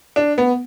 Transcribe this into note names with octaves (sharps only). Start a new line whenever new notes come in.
D4
B3